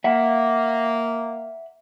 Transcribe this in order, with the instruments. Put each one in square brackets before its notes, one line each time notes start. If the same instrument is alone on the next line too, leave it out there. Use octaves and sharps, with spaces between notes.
[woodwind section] A#3 [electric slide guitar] E5 F#5